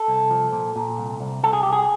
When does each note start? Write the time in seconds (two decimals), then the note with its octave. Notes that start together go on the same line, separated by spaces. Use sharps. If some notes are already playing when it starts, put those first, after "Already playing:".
Already playing: A4
0.08 C2
0.31 F3
0.52 A#2
0.76 A#2
0.98 C2
1.20 C2
1.43 C2 A4
1.53 G#4
1.63 C2 G4
1.73 G#4